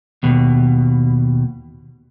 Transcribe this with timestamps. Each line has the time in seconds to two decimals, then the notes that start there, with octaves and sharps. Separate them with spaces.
0.23 D#2 B2